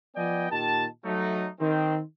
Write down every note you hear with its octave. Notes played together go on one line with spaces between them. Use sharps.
F3 B3 D5 D#5 G5 G#5
A#2 D#3 G4 A5
F#3 A3 D#4
D#3 C4